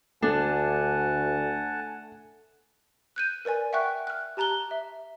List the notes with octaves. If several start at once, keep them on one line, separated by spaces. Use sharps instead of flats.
D2 A3 D4 F#5 G#5 A5
F#6 G6 D#7
A#4 B4 D5 G#5
E5 F#5 G5 C#6 F#6
F6 F#6
G4 A5 A#5 F#6 G7
E5